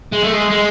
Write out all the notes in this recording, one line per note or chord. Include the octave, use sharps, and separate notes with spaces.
G#3
A3
G#3
G#3